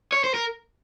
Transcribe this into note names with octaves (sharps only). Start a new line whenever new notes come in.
C#5
C5
A#4